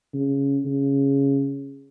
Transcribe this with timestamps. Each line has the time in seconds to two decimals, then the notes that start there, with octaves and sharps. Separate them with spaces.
0.14 C#3
0.65 C#3